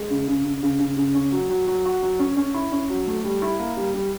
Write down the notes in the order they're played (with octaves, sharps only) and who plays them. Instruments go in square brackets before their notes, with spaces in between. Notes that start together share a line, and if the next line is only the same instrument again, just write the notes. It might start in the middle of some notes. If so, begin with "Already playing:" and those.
Already playing: [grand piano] G#3
C#3
C#3
C#3
C#3
C#3
C#3
C#4
F#3
F#3
F#3
F#4
F#3
C#4
C#4
E4
C#4
F#3
A3
G3
E4
A#3
G3
G3